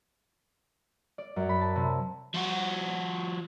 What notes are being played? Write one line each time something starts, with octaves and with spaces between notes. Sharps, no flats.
D5
F#2
B5
A5
C3
F3 F#4